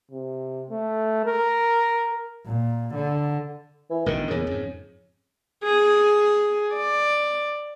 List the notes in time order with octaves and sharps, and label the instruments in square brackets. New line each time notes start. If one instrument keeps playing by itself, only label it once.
[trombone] C3
A3
A#4
[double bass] A#2
D3
[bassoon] E3
[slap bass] A1 B2 D3 [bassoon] D#3
[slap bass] E2 A#2 [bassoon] C#3
[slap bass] F2 G#2
[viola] G#4
D5